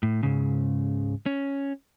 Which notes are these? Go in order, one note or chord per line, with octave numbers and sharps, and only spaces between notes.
A2
C#2 G#2 C#3
C#4